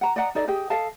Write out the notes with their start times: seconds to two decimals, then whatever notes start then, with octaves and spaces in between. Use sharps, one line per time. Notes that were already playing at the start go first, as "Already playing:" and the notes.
0.01 F#5 A#5
0.16 D5 D#5 F#5 A#5
0.35 D#4 A4 D5 D#5
0.47 G4 G#4 D#5 G5
0.70 A4 D#5 F5 A5